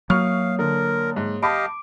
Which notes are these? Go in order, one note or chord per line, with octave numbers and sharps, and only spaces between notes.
F#3 A#3 C#5 F5 C#6 D#6 F6
D3 A#4
G#2
G4 D#5 F5 A5 B5 D6 D7